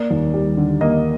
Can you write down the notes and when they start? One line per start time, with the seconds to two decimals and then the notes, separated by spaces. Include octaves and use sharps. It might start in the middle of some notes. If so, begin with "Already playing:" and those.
Already playing: A#3 D5
0.11 D#2
0.34 G3
0.57 D3
0.81 A#3 D#5